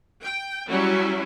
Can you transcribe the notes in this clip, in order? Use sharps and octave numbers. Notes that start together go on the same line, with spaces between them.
G5
F#3 G3 C#4 E4